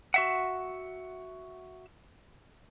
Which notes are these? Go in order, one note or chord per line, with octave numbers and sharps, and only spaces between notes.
F#4 E5 F#5